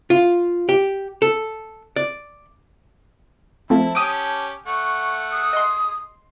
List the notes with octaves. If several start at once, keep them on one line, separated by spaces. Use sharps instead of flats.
F4
G4
A4
D5
F3 A3 C4 E4 A5
C#4 G4 D#6 D7
A3 F#5 C#6
D#6
D#5 C6